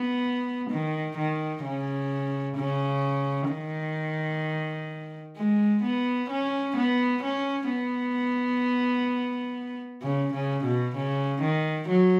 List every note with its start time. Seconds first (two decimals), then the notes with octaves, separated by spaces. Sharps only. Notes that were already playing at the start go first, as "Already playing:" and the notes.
Already playing: B3
0.70 D#3
1.17 D#3
1.64 C#3
2.57 C#3
3.50 D#3
5.36 G#3
5.83 B3
6.29 C#4
6.76 B3
7.23 C#4
7.69 B3
10.02 C#3
10.33 C#3
10.64 B2
10.95 C#3
11.42 D#3
11.88 F#3